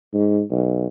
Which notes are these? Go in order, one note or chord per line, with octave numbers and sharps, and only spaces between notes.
G#2
B1